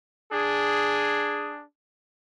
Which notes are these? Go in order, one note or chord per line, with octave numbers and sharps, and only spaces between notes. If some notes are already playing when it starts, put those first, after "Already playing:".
D4 G#4